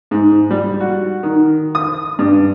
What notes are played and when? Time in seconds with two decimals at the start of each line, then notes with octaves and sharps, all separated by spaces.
0.11 G#2
0.51 G3
0.80 F#4
1.23 D#3
1.75 D#6
2.19 G2